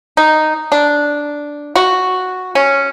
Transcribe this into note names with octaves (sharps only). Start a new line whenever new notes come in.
D#4
D4
F#4
C#4